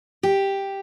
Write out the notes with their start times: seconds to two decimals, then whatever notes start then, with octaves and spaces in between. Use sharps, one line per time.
0.23 G4